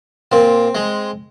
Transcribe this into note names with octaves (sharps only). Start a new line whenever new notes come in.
A#2 C4
G#3